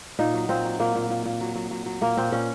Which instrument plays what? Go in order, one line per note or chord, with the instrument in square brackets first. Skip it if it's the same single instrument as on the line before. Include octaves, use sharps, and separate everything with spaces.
[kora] A#2 D#4
F#3
A#2 C4
F#3
A#2 A#3
A#2
A#2
A#2
F#3
F#3
F#3
F#3
A#2 A#3
A#2 C4
A#2 C#4